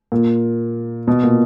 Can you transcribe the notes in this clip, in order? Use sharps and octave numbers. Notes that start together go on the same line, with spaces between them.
A#2
B2
A#2